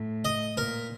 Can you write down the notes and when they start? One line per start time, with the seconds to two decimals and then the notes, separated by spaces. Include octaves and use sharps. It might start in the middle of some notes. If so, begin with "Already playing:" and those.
Already playing: A2
0.25 D#5
0.56 A#2 A#4